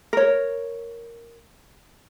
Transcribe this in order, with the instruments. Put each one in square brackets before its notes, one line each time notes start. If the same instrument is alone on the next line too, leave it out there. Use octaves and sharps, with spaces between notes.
[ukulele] A#4 C#5